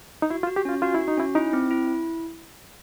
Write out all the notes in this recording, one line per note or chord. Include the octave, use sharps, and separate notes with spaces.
D#4
E4 F#4
F4
F#4
G4
C#4 F4
F4 F#4
E4
F#4
D#4
C#4 E4
D#4 E4
C4
E4
E4